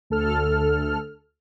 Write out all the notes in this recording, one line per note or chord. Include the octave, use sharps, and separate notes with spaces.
D2 A4 F6